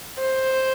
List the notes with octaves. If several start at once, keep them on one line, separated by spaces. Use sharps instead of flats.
C5